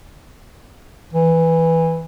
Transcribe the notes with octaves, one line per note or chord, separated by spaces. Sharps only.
E3